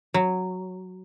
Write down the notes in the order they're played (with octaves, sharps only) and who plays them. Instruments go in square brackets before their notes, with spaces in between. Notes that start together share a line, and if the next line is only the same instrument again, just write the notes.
[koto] F#3